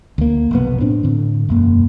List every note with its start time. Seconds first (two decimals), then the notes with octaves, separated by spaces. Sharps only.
0.18 D2 A#3
0.51 F1 B1 B3
0.80 A2 C4 D4
1.03 A2 D3
1.49 E1 F#2 A#3